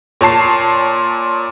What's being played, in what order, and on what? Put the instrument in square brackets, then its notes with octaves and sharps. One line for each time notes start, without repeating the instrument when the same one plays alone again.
[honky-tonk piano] A#2 C#5 A5 C7